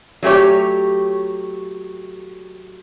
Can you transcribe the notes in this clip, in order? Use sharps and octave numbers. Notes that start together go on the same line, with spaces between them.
F#3 A3 G4 C#5